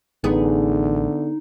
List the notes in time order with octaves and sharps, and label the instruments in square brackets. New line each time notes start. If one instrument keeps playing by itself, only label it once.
[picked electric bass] A1 [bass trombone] D3 [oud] B3 G#4 [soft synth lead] D#4